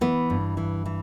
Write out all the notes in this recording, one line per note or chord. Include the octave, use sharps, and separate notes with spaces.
E3 B3
G2
E3
E3